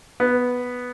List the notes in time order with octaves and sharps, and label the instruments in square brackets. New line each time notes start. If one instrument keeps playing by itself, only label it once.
[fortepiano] B3